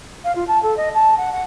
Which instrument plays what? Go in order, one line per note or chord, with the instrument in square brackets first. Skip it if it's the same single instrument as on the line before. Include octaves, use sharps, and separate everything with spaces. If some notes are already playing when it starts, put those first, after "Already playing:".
[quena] F5
F4
A5
A4
D#5
A5
F#5
F#5